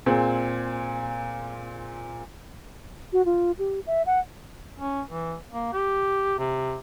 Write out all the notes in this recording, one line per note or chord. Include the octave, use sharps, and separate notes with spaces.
A#2 C4 G#4
F#4
F4
G4
E5
F#5
C#4
E3
A#3
G4
C3